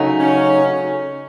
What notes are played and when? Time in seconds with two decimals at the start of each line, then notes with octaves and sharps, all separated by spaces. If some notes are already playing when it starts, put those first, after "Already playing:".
Already playing: C#3 F#3 A3 D#4
0.20 C#4